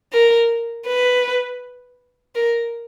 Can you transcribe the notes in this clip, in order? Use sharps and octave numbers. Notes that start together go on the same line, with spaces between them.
A#4
B4
A#4